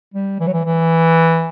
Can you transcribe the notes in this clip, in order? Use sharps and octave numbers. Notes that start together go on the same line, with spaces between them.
G3
E3
F#3
E3
E3